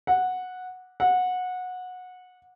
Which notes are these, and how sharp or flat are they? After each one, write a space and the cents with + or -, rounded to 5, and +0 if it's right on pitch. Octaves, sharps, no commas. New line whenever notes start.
F#5 -10
F#5 -20